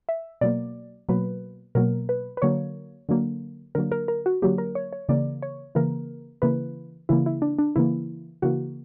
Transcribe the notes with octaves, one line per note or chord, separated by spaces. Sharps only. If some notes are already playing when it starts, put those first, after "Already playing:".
E5
B2 F#3 A#3 D5
B2 F#3 A#3 B4
B2 F#3 A#3 A#4
B4
B4
D3 F#3 A#3 C#5
D3 F#3 A#3
D3 F#3 A#3 A#4
A#4
A#4
F#4
D3 F#3 A#3 G4
A#4
C#5
C#5
C#3 E3 A#3 D5
C#5
C#3 E3 A#3 A#4
C#3 E3 A#3 B4
C#3 E3 A#3 E4
E4
D4
D4
C#3 E3 A#3 E4
C#3 E3 A#3 F#4